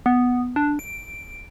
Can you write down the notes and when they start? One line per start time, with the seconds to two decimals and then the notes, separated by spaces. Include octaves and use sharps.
0.06 B3
0.56 D4
0.79 D7